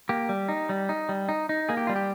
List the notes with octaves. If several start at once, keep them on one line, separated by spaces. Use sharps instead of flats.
A#3 G4
G3
D#4
G3
D#4
G3
D#4
D#4
A#3 G#4
G4
G3 F4
G4